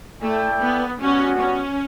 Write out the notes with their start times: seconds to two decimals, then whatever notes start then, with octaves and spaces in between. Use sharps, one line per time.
0.22 A3 E4 A4 D5 G5
0.62 B3
1.00 G3 B3 C#4 F#4
1.40 C#4